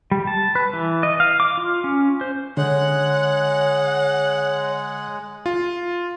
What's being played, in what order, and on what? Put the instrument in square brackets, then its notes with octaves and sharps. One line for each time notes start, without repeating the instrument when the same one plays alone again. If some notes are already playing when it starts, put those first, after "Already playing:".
[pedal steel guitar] G3
A5
B4
E3
D#5
F5
D6
F4
C#4
C5
[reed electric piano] D3 [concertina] G#3 [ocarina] C#5 [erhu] F#5
[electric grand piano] F4